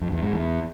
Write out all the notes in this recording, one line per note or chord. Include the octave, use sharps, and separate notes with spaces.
F2
E2
G#2
E2